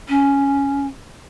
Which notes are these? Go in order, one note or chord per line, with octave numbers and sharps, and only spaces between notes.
C#4